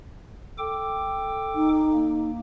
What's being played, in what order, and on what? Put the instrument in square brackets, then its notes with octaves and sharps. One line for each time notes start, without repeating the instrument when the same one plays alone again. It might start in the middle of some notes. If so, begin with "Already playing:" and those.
[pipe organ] A4 G5 D6
[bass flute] D#4
[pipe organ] A#3